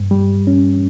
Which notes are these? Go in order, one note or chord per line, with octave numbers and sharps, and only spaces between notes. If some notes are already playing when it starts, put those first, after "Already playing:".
Already playing: G2
G3
C#4